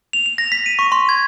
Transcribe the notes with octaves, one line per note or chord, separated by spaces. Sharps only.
F7
F7
A#6
B6
D#7
C#6
C6
G#6